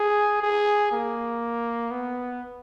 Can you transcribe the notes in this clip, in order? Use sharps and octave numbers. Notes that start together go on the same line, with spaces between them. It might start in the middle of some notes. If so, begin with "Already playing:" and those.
Already playing: G#4
G#4
A#3
B3